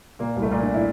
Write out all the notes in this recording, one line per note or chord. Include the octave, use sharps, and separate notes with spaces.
A#2 A#3
C2
A3
A#2 A#3
D4
E4